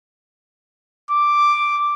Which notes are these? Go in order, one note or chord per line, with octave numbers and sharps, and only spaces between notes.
D6